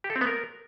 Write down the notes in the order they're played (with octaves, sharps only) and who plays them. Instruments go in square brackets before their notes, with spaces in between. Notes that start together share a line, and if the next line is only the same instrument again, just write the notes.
[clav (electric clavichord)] G4
A4
C4
B3
A#4